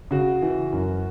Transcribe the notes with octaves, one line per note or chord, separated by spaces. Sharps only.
C#3 F#4
E3
F#2